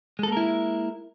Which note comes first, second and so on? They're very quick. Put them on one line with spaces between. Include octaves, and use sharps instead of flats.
G#3 A4 A#3 A#4 E4